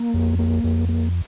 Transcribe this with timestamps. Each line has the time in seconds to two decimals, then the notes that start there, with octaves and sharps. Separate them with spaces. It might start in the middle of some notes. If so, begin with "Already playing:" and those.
Already playing: A#3
0.14 F2
0.39 A#3
0.64 F2
0.89 A#3